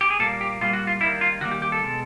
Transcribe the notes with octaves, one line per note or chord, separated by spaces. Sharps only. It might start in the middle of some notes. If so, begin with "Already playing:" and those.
G4
G#4
A#2 G3 A#3 A4
G4
A#2 G3 A#3 F4
F#4
F4
D#3 G3 A#3 E4
F4
D#3 G3 A#3 F#4
G4
G4
A4
B2 G#3